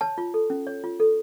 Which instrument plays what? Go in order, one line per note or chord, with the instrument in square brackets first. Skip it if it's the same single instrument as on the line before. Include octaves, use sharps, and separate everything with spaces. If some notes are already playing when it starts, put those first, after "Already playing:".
[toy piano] C#5 A5
F4
A4
C#4
C#5
F4
A4